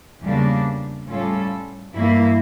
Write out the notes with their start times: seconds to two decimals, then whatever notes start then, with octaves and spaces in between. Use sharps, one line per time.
0.21 E2 C#3 G3 A#3 D4
1.06 A2 G3 C#4 F4 A4
1.93 G2 E3 A#3 E4